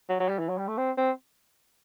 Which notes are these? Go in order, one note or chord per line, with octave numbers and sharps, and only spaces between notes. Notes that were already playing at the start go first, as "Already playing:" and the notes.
F#3
F#3
G3
E3
F#3
G3
A3
C4
C4